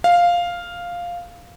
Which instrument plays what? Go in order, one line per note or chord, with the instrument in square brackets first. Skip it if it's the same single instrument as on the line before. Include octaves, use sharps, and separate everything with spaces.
[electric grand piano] F5